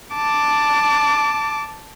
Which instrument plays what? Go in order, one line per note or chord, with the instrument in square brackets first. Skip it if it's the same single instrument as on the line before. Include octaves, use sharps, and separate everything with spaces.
[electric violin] A5 D6